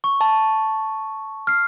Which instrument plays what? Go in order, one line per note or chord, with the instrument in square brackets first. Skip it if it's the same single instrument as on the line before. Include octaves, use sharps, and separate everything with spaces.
[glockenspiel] C#6
[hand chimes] A5
[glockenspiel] F6 C7